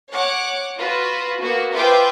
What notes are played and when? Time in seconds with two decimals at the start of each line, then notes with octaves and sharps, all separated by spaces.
0.10 C#5 F#5 D6
0.77 F4 F#4 B4
1.40 A#3 B3 F#4
1.74 F4 B4 C5 E5 G5 D6